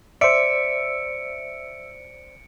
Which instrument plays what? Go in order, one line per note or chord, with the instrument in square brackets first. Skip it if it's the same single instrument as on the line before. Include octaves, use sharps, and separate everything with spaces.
[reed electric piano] C5 D5 [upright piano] E5 [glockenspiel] C#7 D7